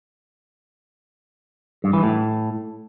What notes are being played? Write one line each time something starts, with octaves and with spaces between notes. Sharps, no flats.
G2
E3
A2